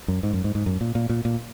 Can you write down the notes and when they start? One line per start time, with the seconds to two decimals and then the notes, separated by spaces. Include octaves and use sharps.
0.08 F#2
0.23 G#2
0.33 F#2
0.44 G#2
0.55 G#2
0.66 F#2
0.81 A#2
0.95 A#2
1.10 A#2
1.25 A#2